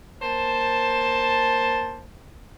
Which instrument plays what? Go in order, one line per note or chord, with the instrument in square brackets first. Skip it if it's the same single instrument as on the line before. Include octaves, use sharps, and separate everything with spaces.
[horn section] A#3 C5 A5